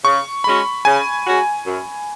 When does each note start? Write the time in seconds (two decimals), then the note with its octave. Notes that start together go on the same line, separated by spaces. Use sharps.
0.05 C#3 C#6
0.44 G#3 C#4 F#4 B5
0.84 C#3 G#5
1.26 G#3 C#4 F#4
1.65 F#2